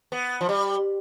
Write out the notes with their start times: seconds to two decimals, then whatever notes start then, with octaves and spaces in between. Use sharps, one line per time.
0.12 B3
0.41 F3
0.49 G3